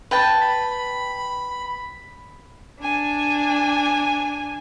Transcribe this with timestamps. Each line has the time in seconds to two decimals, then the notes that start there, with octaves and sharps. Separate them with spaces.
0.11 B4 G5 A5
0.41 B5
2.81 D4 G#5